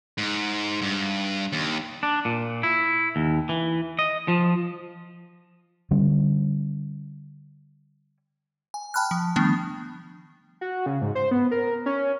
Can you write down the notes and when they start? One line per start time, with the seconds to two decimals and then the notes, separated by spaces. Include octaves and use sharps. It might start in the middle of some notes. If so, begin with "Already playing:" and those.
0.18 G#2
0.82 G2
1.52 D#2
2.03 D4
2.25 A#2
2.63 E4
3.16 D#2
3.49 E3
3.99 D#5
4.28 F3
5.91 D3 G3 C#4
8.74 G#5
8.94 G5 A5 B5 F6 F#6
9.11 F3
9.36 D#3 F3 G3 A3 B3 D4
10.61 F#4
10.86 C#3
11.02 G#2
11.15 C5
11.31 B3
11.51 A#4
11.86 C#4